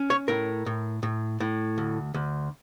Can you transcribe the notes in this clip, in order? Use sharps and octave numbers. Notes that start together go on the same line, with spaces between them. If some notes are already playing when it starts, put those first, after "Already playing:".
Already playing: C#4
C#5
A2 A#4
A2
A2
A2
D2
D2